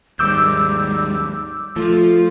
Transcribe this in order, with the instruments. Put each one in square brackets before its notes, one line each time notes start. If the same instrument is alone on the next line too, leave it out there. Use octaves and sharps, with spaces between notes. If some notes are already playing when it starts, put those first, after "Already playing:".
[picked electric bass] D#2 G#2 [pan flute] G3 [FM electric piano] D6 E6 G6
[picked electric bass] F3 [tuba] A3 [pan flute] F4